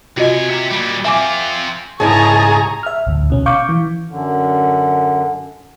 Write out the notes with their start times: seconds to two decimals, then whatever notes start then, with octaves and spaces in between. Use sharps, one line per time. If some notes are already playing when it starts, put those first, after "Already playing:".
0.17 C3 F4 F#4 D#5 G#5
0.50 C4 E5
0.71 A#2 G3
1.05 C4 F4 E5 G#5 D6
2.00 C#2 G#2 E4 G#4 A5 A#5 C#6
2.83 E5 F6
3.06 A1 D2
3.30 B2 C#4
3.46 F5 C#6 D6 G6
3.69 E3
4.09 F#2 D3